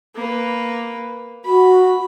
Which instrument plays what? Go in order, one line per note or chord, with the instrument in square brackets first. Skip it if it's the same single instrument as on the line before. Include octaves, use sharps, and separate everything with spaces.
[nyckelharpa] A#3 B4
[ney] F#4 [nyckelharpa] B5